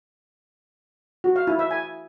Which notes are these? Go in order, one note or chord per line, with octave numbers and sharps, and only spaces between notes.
F#4
F5
E4
E5
G#5